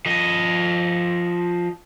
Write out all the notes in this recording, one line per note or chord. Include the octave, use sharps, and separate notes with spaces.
F3 D#5